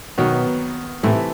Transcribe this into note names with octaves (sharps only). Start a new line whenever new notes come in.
B2 D#3 F#3 B3 F#4
A2 C3 E3 A3 E4